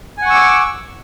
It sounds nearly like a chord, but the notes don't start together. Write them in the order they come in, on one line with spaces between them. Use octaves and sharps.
G#5 F#5 C#6 E6 D6